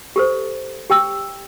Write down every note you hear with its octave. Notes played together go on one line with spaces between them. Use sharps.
G4 A4 C5
G4 G5 E6